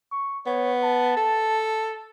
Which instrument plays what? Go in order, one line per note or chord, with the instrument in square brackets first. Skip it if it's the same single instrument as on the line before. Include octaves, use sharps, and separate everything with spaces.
[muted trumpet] C#6
[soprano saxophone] B3 [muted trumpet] C#5
[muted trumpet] A5
[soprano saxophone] A4